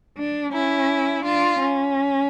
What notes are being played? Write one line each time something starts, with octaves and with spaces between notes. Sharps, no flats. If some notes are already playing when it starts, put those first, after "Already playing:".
D4
C#4 E4
D4 F4
C#4